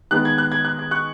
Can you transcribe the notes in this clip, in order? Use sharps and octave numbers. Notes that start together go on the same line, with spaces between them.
D#3 G#3 B3 F#6
G#6
F#6
G#6
F#6
G#6
C#6 F#6